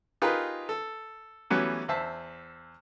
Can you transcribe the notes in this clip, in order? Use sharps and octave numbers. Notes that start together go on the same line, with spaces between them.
D#4 F4 G4 G#4 A#4 B4
A4
E3 F#3 G3 A3 B3 C#4
E2 C5 E5 A5